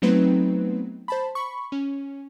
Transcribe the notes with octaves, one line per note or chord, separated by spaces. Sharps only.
F#3 A3 B3 C4 D#4 B4
C5 A5 B5
B5 C#6
C#4